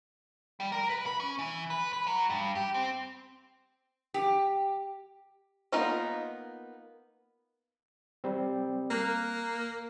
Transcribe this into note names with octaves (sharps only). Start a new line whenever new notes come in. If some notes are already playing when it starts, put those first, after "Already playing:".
G3
A#4
B4
B5
C#4
E3
B4
B4
F#3
G2
G4
C4
G4
A#3 B3 D#4 F4 A#4
G3 C4
A#3 A#5 F6 F#6